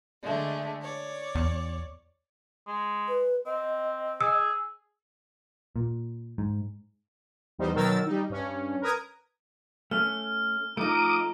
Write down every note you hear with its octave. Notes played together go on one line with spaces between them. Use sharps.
D3 G#3 A3
C#5 D5
E2
G#3
B4
C4 D#5
G#4 E6
A#2
G#2
E2 G3 D#4 C5
B2 D#3 F#3 A#4 E6 A6
G3 D#4
G2 C#4
A#4 B4 A#5 D#6 G#6
A3 C#4 F6
F3 A3 D#4 A#5 D6 D#6